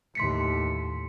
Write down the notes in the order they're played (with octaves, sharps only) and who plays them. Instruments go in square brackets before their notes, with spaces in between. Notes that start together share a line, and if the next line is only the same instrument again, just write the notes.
[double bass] D#2 A2 [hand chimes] C6 B6 C#7